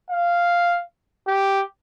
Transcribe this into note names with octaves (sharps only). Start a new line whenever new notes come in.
F5
G4